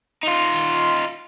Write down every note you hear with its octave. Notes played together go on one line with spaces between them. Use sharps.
D#4 F4